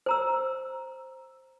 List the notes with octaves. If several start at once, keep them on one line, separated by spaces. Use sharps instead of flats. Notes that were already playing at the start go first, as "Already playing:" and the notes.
C5 A#5 E6